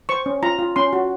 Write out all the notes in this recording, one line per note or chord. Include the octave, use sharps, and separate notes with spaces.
C5 C#6
C#4
F4 A#5
F4
C#4 C6
F#4